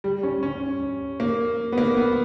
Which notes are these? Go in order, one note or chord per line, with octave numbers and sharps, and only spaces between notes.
G3
C#4
C#4
A#3
B3
A#3
B3